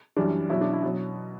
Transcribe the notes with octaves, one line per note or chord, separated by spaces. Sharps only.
F#2 E3 G3 D4
B2 F#3 E4
D4
E4
B2 F#3